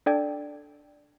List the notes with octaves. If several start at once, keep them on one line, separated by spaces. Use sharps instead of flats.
D4 A4 D5 G5 G#6